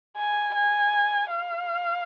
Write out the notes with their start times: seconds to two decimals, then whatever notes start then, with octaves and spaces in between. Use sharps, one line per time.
0.17 G#5
0.55 G#5
1.30 F5